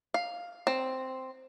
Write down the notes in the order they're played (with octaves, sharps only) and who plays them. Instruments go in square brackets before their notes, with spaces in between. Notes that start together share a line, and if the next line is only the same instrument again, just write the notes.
[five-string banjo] F5
C4